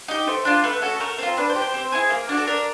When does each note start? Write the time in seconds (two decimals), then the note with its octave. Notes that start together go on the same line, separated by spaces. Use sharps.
0.08 D#4 G4
0.27 A3 C5
0.45 D4 F4
0.64 A3 B4
0.82 C#4 F#4 A4
1.00 A3 A#4
1.18 C4 F4
1.37 D4 B4
1.50 C5
1.56 G4
1.62 C5
1.74 C4
1.92 E4 G#4
2.10 A#3
2.29 D4 F#4
2.37 A4
2.47 D4 A#4